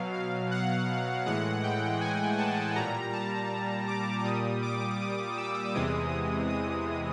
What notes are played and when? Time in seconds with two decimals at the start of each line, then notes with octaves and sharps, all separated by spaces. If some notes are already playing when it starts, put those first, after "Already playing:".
Already playing: B2 F#3 F5
0.13 F5
0.51 F#5
1.26 A2 E3 G#3 F#5
1.63 G5
2.01 G#5
2.38 A5
2.76 A#2 G3 A#5
3.13 A5
3.88 D6
4.24 A#2 G3 D#6
4.62 D6
5.00 D#6
5.37 E6
5.75 E2 C3 E3 G#3 D#6
6.49 D#6